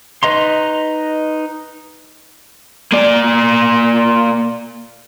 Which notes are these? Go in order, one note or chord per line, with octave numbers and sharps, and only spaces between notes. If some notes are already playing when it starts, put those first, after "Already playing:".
D#4 B4 D#5 A#5 C6
A#3 D5